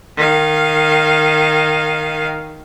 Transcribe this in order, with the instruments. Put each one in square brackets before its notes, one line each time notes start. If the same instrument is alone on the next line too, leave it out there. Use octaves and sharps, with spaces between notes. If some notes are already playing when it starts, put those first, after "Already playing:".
[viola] D#3 F5